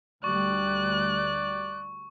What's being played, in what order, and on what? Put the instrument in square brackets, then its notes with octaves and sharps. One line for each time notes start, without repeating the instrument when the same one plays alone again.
[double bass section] D2 G3 [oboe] D5 [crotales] C#6 [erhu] F#6